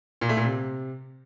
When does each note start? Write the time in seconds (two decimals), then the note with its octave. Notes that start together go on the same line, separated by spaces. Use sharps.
0.21 A#2
0.29 A3
0.37 A#2
0.45 C3